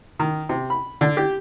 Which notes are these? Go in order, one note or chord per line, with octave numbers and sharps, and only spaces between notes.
D#3
C3
B5
D3
G4